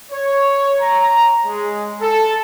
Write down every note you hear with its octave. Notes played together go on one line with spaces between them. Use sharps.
C#5
A#5
G#3
A4